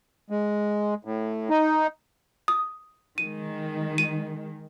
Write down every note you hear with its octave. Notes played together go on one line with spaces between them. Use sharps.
G#3
A2
D#4
D#6
D#3 G#3 D#7
D#7